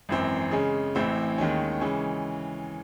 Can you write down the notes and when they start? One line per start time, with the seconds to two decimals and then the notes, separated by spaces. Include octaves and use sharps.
0.09 G#1 F#2 E3 C4
0.51 C#3 G#3 C#4
0.95 A1 A2 E3 C4 E4
1.38 D#2 D#3 G#3 C#4
1.81 C#3 E3 G#3 C#4